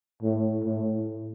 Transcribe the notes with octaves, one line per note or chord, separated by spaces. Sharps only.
A2
A2